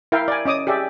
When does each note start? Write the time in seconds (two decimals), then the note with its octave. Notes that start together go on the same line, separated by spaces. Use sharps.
0.12 E4 A#4 E5 F5 G5
0.28 D5 G#5
0.45 C#4 D#5 D6 D#6
0.67 G4 G#4 D5 E5